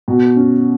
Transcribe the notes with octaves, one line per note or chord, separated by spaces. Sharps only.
B2
C#4